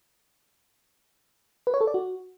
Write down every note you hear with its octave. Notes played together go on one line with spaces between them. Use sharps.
B4
C#5
A4
D5
F#4